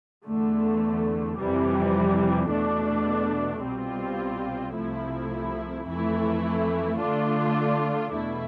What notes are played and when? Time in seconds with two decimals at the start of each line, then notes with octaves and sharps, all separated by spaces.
0.25 E2 D3 A3
1.37 F2 C3 E3 G3
2.50 E2 B2 A3 D4
3.62 C2 B2 G3 C4 F4
4.75 C2 C3 F3 A3 E4
5.87 F2 E3 A3 E4
7.00 D3 A3 D4 F4
8.12 E2 B2 A3 E4